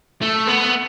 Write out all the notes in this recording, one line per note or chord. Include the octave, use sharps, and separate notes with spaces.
A3
B3